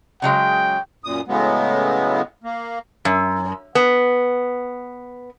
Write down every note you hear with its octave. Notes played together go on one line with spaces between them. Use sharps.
C#3 F#3 G#3 G5
F#2 A#2 D#6
A2 C#3 F#3 G#3 B3
A#3
F#2
B3